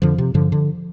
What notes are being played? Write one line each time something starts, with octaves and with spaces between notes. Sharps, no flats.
F2 D3 F3
C3
G2 D3 F3
D3